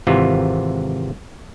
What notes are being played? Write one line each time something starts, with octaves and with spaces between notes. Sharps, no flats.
G#1 C3 E3 F4